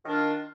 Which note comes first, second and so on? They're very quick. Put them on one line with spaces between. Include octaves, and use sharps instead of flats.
D#3 D4 F4